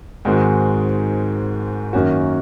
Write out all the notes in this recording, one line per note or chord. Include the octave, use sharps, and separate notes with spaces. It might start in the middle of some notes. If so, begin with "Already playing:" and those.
G#2 D#3 G#3 C4 F#4
F#2 D#3 A#3 C#4 F#4